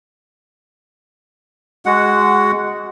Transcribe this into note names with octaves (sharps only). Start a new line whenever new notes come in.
G#3 F#4 F#5